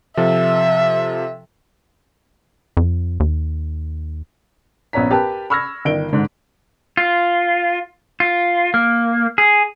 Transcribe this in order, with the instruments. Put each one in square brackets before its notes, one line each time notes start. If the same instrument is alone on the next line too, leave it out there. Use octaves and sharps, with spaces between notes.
[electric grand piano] C3 F3 A4 [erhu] E5
[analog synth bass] F2
D#2
[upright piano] A#1 B3 C#4 A#5 B6
G4 A#4 B4 G5 A5
B5 C#6 E6 F6 G#6 A#6
G1 D#3 D7 G7
G#2 D3
[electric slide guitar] F4
F4
A#3
G#4